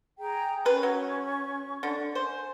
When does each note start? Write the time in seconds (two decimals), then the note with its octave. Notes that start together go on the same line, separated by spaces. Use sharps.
0.20 G#4 G5 A#5
0.65 C#4 G#4 B4 C#6
0.83 F#3
1.83 D3
2.15 C5 G#5